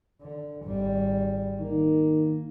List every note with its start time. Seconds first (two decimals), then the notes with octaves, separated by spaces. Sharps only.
0.22 D3
0.64 G#1 G3
1.61 D#3 A#3